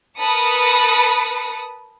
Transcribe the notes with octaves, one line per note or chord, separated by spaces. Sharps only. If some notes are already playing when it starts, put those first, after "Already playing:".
A#4 B4 A5 B5 D#6 C#7